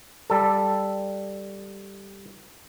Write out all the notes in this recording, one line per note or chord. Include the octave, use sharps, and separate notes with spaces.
G3 A4